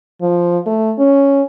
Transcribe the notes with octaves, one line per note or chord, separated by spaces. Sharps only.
F3
A3
C#4